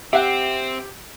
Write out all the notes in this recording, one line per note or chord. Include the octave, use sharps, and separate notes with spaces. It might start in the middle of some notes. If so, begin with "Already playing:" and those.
C4 G4 E5 F#5